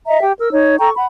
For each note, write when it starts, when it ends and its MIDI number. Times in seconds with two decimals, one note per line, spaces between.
0.07 0.21 75
0.07 0.21 76
0.07 0.21 82
0.21 0.33 67
0.21 0.33 79
0.39 0.51 70
0.39 0.51 88
0.52 0.76 63
0.52 0.76 73
0.78 0.90 69
0.78 0.90 79
0.78 0.90 82
0.78 0.90 85
0.95 1.06 78
0.95 1.06 83